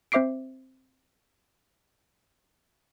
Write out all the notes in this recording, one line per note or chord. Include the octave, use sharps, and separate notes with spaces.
C4 C5 E5 D6 C7 D7